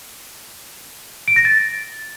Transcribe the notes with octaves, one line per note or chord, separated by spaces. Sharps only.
D7
A#6
A6